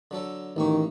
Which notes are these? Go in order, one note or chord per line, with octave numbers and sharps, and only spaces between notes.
D3 F#3 A4
A1 D#3 A#3 C#6